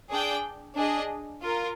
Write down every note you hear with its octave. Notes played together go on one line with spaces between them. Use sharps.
D4 G#4 D5 G5
D4 G#4 D#5
F4 A#4